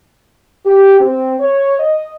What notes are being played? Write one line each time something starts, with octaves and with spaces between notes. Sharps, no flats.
G4
C4
C#5
D#5